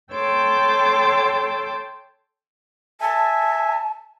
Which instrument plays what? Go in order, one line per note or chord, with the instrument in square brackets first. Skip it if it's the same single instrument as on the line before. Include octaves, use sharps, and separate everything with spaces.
[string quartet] A4 C#5 G5 C6 D6 E6
[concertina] E5 G#5 [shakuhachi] A5